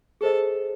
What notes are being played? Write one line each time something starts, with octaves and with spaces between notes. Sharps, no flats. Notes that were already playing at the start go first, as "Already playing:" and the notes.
G#4 A4 C5 D#5